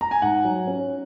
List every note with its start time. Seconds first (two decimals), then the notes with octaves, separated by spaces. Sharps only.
0.01 A#5
0.11 G#5
0.22 G#2 F#5
0.44 F#3
0.67 C#4